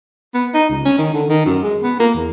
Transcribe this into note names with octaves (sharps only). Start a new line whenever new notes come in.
B3
D#4
C#2
C#4
D#3
D3
D#3
F#2
G#3
B3
A#3
E2